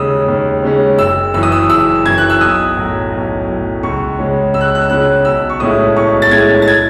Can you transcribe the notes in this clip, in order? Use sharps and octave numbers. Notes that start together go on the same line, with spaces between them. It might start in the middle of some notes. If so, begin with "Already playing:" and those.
Already playing: D#2 C#3 G#3 C#4 D#6 E6
D#2
C#3 G#3 C#4
F#1 E6
F#2 E3 E6
D#6
E6
F#1 E6
F#2 E3 G#6
F#6
E6
B1 D#6
A2 F#3
B1
A2 F#3
C#2 C#6
C#3 G#3 C#4
C#2 E6
F#6
E6
F#6
E6
C#3 G#3 C#4 F#6
B1 E6
C#6
A2 G#3 C#4 E4 D#6
B1 C#6
A6
A2 G#3 C#4 E4 G#6
A6
G#6